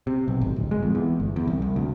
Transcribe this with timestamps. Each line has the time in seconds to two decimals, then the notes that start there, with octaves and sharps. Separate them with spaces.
0.07 C3
0.28 B1
0.41 G#1
0.56 D1
0.71 G#3
0.83 F2
0.95 E2
1.20 G1
1.36 E2
1.47 C2
1.62 C2
1.76 D2